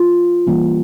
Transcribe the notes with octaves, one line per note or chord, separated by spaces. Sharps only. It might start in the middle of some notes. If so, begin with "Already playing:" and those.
Already playing: F4
E3 G3 A#3 C#4